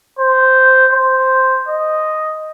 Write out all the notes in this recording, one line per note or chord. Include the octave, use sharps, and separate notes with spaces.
C5
C5
D#5